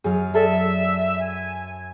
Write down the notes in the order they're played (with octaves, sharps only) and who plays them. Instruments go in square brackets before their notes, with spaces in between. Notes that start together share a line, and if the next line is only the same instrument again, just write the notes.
[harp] F#2 F#3 F6 [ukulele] G#4 G#5
[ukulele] G#4 A4 D5 [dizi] E5
[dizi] G#5